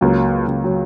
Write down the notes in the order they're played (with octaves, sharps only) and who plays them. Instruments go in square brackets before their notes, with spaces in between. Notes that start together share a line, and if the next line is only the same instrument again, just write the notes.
[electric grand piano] C#2 [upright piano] F#3 A#3
[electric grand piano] C#2
[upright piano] F#3